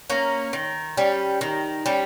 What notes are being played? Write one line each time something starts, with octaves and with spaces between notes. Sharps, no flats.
A#3 C#4
D#3
G3 C#4
D#3
G3 C#4